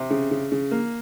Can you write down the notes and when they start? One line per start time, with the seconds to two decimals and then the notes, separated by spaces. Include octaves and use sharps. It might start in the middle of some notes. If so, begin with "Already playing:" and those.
Already playing: C3
0.10 C#3
0.31 C#3
0.52 C#3
0.71 A#3